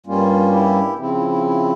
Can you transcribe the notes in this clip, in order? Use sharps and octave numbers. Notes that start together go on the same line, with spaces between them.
G2 G3 A#3 C#4 F4
E4 G4
C#3 F3 C4 E4
E4
E4
E4